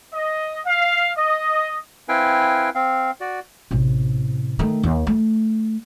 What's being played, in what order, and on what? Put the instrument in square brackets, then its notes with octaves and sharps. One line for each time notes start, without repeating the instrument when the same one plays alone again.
[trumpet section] D#5
F5
D#5
[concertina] C4 E4 B4 F5 G5 G#5
C4 F5
F#4 D5
[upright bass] A1 C3
D#3 A3
D#2
A3